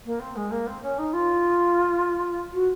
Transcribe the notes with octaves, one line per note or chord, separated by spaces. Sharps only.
A#3
C4
G#3
A#3
C4
C#4
D#4
F4
F#4